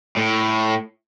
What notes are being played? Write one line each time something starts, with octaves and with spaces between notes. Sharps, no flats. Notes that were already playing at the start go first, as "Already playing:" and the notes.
A2